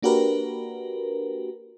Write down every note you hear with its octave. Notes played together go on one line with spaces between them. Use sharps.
A#3 D4 F#4 G4 A#4 B4